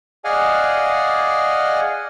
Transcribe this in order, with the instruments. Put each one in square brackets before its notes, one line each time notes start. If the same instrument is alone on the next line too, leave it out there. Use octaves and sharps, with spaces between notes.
[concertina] G#4 D5 D#5 F5 F#5 G#5